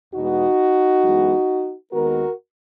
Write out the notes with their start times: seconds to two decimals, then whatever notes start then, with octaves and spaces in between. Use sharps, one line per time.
0.14 E2 B2 G#3 B3 D#4 F#4
1.04 F#2 E3 G#3 B3
1.92 D#2 D#3 G#3 B3 F#4 A#4